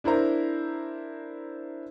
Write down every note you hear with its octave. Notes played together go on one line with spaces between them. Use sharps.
D4 E4 A#4 C5 A#5